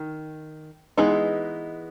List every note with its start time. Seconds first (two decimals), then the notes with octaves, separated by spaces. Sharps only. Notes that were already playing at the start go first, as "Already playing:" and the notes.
Already playing: D#3
0.97 E3 G#3 B3 D#4 G#4